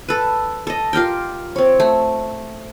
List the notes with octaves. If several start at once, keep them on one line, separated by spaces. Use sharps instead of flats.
A4 B4
A4 D#5
F4 G4 A#4 G5
C4 C#5
A3